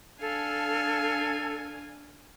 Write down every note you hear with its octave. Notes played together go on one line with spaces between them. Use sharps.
D4 A4 F5 G#5